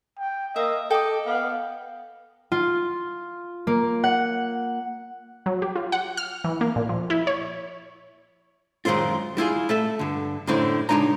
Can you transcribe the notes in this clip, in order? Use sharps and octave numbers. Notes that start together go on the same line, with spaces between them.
G5
A#3 D#5 E5
A4 D#5 G5 D6
B3 F5
F4
A#3
F#5
F#3
G4
F4
F#5
F6
E3
A#3
A#2
F3
E4
C#5
F#2 D#3 G#3 C4 F4
G3 E4 F4 G#4
A3 A4 E5
G2 D3
F#2 A2 D3 C4 E4
C#2 G#3 D4 D#4 A#5